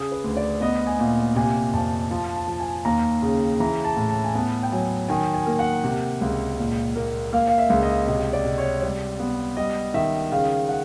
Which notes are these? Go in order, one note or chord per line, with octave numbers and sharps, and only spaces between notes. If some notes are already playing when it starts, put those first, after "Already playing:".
Already playing: C#3 G#4
B4
D2
D5
B3 D#5
G#5
A#2
C3 G#5
F2 A5
F3 A5
A5
F3
G#5
D#2 A#5
C#3
E3 A#5
A5
A2
A5
G#5
B3 A5
G5
F#3 G#5
D#3 G#5
G#5
A#3
F#5
C3
C#2
A#2
A#3
A#3 F5
F5
E5
C#2
D#5
C3 D#5
D5
C3
C#5
G3 D5
B3
G3 D#5
D#3 E5
C#3 F5
F#5